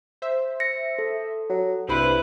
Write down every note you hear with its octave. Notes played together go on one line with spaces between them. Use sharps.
C5 E5
A#6 C#7
A4
F#3
C2 G2 E4 B4 C5 B5